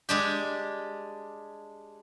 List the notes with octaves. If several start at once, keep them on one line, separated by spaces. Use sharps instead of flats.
G#3 D4 G4